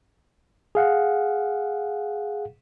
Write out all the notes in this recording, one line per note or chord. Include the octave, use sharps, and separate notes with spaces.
G#4 F5 F#5